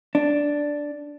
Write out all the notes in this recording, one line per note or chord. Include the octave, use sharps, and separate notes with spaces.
D4